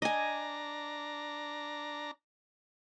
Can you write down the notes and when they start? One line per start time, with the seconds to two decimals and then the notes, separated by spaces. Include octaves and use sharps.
0.02 D4 D#5 G#5 A#5